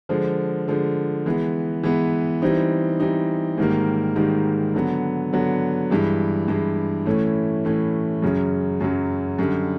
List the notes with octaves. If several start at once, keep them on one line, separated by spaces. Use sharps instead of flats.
D3 F3 G#3
D3 F3 G#3
E3 G#3 B3
E3 G#3 B3
E3 G3 C4 D#4
E3 G3 C4 D#4
G#2 D#3 G3 A#3
G#2 D#3 G3 A#3
D3 F#3 B3
D3 F#3 B3
G2 E3 G#3
G2 E3 G#3
A2 E3 A3 C#4
A2 E3 A3 C#4
F#2 C#3 F#3
F#2 C#3 F#3
F#2 D3 G3